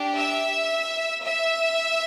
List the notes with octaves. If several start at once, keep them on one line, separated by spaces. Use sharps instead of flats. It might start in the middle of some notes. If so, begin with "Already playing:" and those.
Already playing: D4 G4
E5
E5